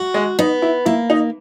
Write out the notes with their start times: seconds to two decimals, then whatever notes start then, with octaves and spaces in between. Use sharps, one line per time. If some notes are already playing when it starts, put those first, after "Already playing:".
Already playing: F#4
0.14 G#3
0.39 B3 D#4
0.62 E4
0.85 A#3 E4
1.10 D#4